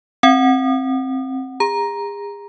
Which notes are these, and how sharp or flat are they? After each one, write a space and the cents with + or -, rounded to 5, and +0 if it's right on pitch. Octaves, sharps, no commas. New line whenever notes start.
C4 +15 F#5 +0
G#4 -40 A#5 +10